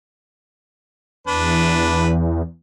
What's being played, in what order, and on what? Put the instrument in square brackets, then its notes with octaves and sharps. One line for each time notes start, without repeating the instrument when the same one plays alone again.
[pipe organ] E2 [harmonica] D4 B4